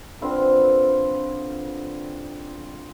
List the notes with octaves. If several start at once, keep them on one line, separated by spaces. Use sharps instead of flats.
D3 C4 F4 B4